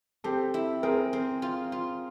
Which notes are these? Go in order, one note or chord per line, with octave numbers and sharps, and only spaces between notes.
C4 G4 A4
E4
C4 G#4 A#4
C4
F4
F4